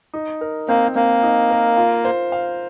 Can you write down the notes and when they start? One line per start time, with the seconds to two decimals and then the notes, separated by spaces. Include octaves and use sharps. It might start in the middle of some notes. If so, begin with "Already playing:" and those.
0.13 D#4
0.41 A#4
0.68 A#3 C4
0.96 A#3 C4
1.23 D#4
1.50 A#4
1.77 F4
2.05 C5
2.32 F5